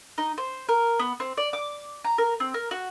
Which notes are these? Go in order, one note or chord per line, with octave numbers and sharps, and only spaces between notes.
D#4
C5
A#4
B3
C4
D5
D6
A#5
A#4
C4
A#4
F#4